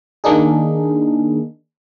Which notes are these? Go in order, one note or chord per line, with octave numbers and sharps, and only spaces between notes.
D#3 A#3 D4 D#4 G#4